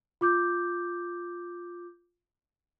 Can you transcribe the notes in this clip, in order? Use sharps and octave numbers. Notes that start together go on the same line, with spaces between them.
F4 D6 G6